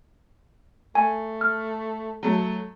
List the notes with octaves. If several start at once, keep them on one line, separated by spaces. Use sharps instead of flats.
A3 G#5
F6
F#3 A3